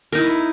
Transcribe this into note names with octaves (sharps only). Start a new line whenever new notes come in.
D#4 E4 A#4